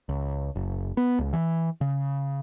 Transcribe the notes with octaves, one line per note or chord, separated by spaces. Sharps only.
C#2
F#1
B3
C#2
E3
C#3